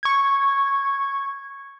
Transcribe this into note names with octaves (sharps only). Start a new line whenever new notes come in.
C#6 G#6